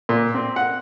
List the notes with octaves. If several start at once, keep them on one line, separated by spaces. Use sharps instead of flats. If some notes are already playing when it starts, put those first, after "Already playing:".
A#2
C4
F#5